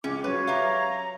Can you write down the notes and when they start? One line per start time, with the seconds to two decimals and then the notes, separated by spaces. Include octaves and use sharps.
0.04 C#2 C#4 D6
0.24 F#3 F4 B4 C#5
0.47 G4 E5 F5 A#5